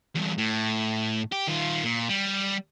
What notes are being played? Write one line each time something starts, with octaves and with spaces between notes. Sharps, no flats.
E2 G2
A2
G4
D#3 F4
A#2
G3